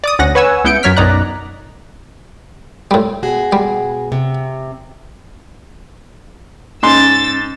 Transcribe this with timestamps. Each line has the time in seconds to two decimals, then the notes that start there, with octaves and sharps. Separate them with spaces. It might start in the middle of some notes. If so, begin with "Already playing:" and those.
0.04 D5 D6 D#6
0.19 D2 C#4 F#5 A#6
0.35 B4 C#5 F#5 G#5 E6
0.64 C#2 B3 E4 G6 C#7 D7
0.83 F#2 F#3 C#5 F6 B6
0.97 B1 F#2 D#4 D5 A#5 F#6
2.91 A2 G3
3.23 B2 F#4 G#4
3.52 G3
4.12 C3
6.83 G#2 C#4 C6 E6 A6